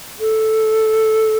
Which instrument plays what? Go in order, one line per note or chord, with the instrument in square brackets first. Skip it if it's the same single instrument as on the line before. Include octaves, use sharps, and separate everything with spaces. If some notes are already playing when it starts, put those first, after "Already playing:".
[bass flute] A4